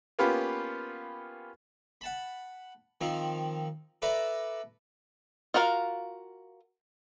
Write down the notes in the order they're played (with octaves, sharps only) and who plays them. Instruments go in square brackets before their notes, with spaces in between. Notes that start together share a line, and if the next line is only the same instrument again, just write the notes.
[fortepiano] A#3 B3 C#4 F4 G4 B4
[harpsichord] F#5 A5 B5
D#3 F3 C4
A4 B4 D5 E5 A#5 B5
[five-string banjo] F4 F#4 A#4 C#5 F5